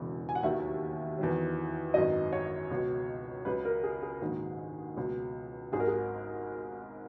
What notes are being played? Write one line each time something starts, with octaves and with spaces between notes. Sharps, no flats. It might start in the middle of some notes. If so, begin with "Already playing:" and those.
Already playing: E1 E2 C#3 F#3
G#5
F#5
D#2 D#3 F#3 E5
E2 D#3 F#3
G#1 F#2 D#3 F#3 D#5
C#5
C#2 B2 F#3
C#2 C#3 F#3 B4
A#4
G#4
G#4
A#1 G#2 D#3 F#3
C#2 B2 F#3
G#1 G#2 F#3 G#4
A#4
G#4